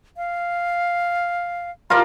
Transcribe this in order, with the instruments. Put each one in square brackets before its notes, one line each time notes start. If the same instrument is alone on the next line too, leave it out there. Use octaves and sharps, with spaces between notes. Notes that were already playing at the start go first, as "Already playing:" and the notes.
[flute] F5
[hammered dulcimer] F4 A#4 D5 [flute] B5